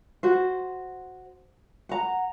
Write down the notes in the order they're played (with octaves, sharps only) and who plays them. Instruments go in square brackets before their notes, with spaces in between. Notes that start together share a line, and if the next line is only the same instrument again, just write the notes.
[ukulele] F#4 C5
F#5 A#5